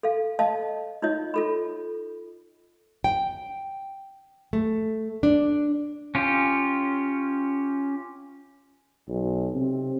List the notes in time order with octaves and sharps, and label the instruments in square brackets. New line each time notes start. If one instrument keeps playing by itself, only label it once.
[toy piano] A4 F5
D#5 F5 A5
D#4 F4 C#5 D#5
F4 A4 B5
[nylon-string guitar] G5
A3
D4
[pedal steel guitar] C#4 F4 G4
[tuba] B1
C3